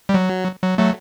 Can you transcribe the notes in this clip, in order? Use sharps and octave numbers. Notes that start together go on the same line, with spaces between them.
G3
F#3
F#3
F#3 A3